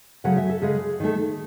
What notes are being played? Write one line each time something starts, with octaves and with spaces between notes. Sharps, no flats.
C#3 F#3 A3 F#5
E5
A4
C#3 G#3 G#4
D#3 A3